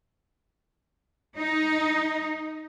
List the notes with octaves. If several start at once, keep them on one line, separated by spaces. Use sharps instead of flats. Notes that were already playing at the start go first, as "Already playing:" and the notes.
D#4